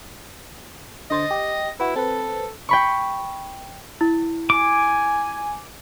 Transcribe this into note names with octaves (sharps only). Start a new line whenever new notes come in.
D3 C5 D#5 A6
G4
E4 F#4 B4
C4 A4 B4
G5 B5 C#6
E4
G#5 D6